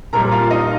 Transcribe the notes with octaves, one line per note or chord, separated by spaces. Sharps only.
A#1 A#2 G3 A#4 A#5
F4 F5
D#4 D#5